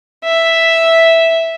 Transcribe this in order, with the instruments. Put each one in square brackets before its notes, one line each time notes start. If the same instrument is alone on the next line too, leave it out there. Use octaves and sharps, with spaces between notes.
[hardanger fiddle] E5